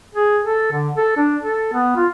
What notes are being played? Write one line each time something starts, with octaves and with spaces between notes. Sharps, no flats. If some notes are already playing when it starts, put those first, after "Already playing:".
G#4
A4
D3
A4
D4
A4
B3
F4